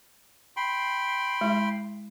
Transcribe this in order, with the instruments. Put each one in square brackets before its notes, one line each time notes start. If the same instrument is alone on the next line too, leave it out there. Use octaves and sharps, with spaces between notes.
[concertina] G5 B5 C6
[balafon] G#3 E4 E5